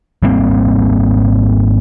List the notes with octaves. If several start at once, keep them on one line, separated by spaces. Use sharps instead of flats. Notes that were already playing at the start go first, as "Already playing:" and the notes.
G#1 G3 A#3 C4